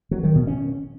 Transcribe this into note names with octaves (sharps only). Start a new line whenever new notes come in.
F#3
D#3
B2
C#4